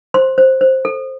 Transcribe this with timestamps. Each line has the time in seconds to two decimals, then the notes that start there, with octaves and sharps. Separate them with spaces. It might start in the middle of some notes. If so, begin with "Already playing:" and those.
0.14 C5 C6
0.38 C5
0.61 C5
0.85 A4